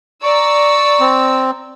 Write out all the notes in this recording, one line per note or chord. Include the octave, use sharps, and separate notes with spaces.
D5 A#5 C#6 E6
C4